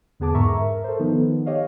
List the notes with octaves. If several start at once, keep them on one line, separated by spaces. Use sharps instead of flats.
E2 D3 B3 G#4 A5 D6
G#2 A#4 E5 A#5 C#6
A#4
A4 C5
D#3 F3 B3 D#4
G4 C#5 D#5 F5